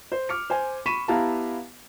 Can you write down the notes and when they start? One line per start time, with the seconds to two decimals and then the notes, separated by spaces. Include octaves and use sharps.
0.12 C5
0.29 D6 F6 C#7
0.50 C5 G#5
0.86 B5 C#6 B6 D#7 E7
1.08 B3 E4 G4 F5 A5 A#5